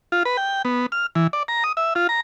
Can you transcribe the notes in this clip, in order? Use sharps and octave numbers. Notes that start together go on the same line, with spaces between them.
F4
B4
G5
B3
F6
E3
D5
A#5
D#6
E5
F4
A#5